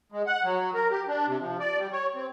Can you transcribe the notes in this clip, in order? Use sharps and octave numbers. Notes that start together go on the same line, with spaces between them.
G#3
F#5
F#3
A#4
G4
D4
C3
F3
D5
G3
C#5
C4